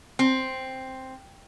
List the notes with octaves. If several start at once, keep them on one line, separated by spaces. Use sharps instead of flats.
C4